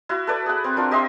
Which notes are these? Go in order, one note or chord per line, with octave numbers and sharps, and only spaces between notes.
E4 F#4
A4 B4 D5
G#4 F#5
C4
D4 F4 A#4
G4 D#5 E5 C6